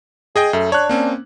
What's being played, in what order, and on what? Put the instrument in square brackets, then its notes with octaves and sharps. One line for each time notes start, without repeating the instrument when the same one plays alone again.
[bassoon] G#3 [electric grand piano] G#4 D#5 G5
[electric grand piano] F#2 [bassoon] A3
[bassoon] D4 [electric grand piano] C#5 F#6
[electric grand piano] A#3 C4 C#4